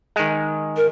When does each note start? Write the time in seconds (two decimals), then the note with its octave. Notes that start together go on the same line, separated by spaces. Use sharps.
0.16 D#3 G#3
0.77 A#4